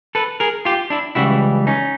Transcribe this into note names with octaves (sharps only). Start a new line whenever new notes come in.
A4 B4
G#4 A#4
F4 G4
D4 E4
C#2 C#3 E3 G3 E4 F#4
C#4 D#4